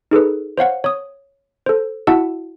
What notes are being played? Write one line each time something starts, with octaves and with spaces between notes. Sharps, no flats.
D#4 G#4 A4 B4
C5 C#5 F5 F#5
C#5 D#6
A4 C5
E4 F#4 E5 F#5 A5 E6